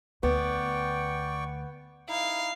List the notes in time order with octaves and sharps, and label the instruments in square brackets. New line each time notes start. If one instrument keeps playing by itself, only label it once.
[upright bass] D2 [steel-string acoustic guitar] B3 [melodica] D5 G5 C#6
[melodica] D#4 E4 [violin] F5